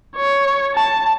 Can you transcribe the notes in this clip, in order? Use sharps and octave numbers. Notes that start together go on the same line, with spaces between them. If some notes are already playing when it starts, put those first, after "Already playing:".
C#5
A5